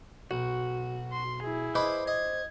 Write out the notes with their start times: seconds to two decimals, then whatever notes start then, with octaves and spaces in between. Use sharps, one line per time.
0.31 B1 F#4
1.12 C6
1.43 E4 G#4
1.75 B4 C5 D#5 B5 D6
2.07 D#5 G#6